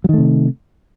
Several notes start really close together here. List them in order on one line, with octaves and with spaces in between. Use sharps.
F#3 D#3 A3 C3